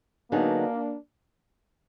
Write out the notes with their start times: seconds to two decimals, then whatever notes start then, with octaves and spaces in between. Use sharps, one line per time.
0.31 D3 F#3 A#3 B3 D4 D#4 G#4